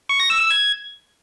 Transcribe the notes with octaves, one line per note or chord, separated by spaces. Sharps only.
C#6
A#6
E6
E6
G#6